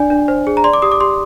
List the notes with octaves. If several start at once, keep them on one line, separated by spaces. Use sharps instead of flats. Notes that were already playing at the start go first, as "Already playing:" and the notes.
Already playing: D4 D5 G#5
D4
C5
G#4
A#5
D5 C6
D6
G4 D#6
D6
G4 C6